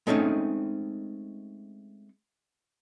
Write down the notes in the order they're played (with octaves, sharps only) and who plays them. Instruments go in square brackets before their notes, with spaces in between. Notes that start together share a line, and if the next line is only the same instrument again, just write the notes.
[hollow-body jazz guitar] G#3 A3 C4 C#4 D#4